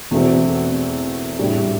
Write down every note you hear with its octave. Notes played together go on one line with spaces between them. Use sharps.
E2 B2 A3 C4
A2 G3 D4